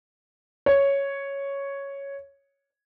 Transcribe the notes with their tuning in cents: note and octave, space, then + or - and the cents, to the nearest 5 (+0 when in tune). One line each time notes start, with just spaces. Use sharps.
C#5 +0